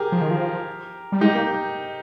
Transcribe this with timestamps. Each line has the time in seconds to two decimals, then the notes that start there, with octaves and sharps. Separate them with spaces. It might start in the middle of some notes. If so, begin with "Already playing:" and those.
Already playing: G4 G#4 A#4
0.12 F3
0.22 D#3
0.31 F3
1.12 G3
1.21 G#3 D#4 G4
1.35 A#3